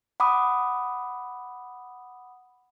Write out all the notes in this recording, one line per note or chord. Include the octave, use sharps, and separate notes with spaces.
F#5 B5 D6 D#6